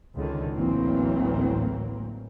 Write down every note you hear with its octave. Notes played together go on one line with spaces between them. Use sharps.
C#2 D3 D#3
A1 D2 E3 F#3 A#3 C4